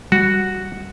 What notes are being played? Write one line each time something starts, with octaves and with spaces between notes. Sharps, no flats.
G3 F#4